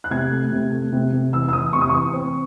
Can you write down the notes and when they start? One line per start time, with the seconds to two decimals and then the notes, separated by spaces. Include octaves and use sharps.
0.04 F#6
0.11 C3 G#6
0.31 A3
0.52 C3
0.71 A3
0.92 C3
1.12 C3
1.32 E3 E6
1.48 E6
1.53 E3 D#6
1.73 C3 C#6
1.81 D#6
1.89 E3 C#6
2.13 C4